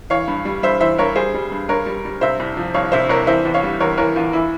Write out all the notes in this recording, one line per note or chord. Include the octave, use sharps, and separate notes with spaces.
E3 C#5 F5
G2
G3
G2 C5 E5
E3 C5 E5
G2 A#4 C#5
G3 G#4 C5
G3
G2
G2 A#4 C#5
G3
G3
C3 C5 E5
C2
F3
C2 C#5 F5
C3 C5 E5
C2 A#4 C#5
E3 C5 E5
E2
C#5 F5
G3
E2 A#4 C#5
E3 A#4 C#5
E2 F4
E3 E4